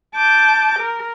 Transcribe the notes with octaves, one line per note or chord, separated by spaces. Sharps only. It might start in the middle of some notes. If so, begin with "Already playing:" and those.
A5 D6 G6
A#4